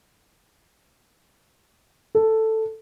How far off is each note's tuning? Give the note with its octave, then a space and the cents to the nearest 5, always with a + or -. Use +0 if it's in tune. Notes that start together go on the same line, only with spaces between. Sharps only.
A4 +5